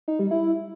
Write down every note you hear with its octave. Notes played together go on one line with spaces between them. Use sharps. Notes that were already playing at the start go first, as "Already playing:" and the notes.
D#4
G3
E4